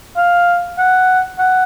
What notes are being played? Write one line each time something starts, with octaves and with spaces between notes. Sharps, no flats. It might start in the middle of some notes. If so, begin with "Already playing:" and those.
F5
F#5
F#5